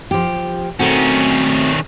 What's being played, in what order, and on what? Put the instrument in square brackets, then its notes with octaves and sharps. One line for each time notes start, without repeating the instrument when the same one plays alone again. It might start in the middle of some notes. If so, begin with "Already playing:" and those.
[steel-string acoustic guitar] F3 G4
[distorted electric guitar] D#3 C#4 [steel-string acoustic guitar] A3 C4 F#4